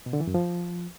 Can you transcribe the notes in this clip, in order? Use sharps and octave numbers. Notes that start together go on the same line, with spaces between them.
B2
D3
E3
F#2
F3